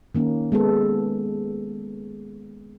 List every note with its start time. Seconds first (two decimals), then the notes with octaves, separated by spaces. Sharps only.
0.15 D#3 A#3 C#4
0.52 G#3 B3 A4